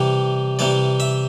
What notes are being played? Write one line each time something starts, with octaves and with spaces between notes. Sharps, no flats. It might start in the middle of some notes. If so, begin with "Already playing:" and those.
Already playing: C3 E3 G3
C3 E3 G3 D5
E5